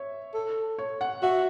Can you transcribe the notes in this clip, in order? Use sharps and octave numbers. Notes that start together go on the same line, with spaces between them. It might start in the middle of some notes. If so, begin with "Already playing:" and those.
Already playing: C#5 E5
A4
C#5
F#5
F#4 E5